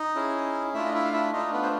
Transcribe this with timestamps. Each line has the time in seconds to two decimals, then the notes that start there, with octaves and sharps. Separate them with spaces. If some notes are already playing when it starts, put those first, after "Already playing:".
Already playing: D#4 D#5
0.15 C#4 E4 G#4
0.74 A3 D4 E4 F4 E5
0.85 D#5
0.94 E4 E5
1.05 F5
1.13 E4 E5
1.33 A3 D4 D#4 F4 D#5
1.53 B3 B4
1.63 C5